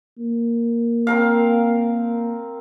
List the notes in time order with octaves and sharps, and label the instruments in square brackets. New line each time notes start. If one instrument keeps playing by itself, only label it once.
[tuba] A#3
[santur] C4 A#4 F5